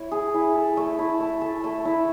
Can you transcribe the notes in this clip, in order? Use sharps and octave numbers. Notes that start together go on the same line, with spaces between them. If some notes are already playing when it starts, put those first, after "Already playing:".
Already playing: E4 C#5
G#4
E4
A4
A3
E4
A3
A4
A3
E4